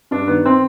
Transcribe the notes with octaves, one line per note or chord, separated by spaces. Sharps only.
G2 D4
D#3 B3
C4